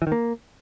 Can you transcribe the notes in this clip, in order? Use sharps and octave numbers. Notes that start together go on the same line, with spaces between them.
E3
D#3
A#3